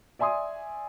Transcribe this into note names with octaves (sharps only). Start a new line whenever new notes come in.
D5 E5 G#5 C6 D#6